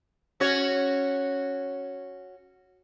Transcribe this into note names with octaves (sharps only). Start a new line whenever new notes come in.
C#4 F#4 C#5